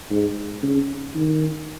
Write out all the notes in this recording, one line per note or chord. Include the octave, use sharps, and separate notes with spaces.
G#2
C#3
D#3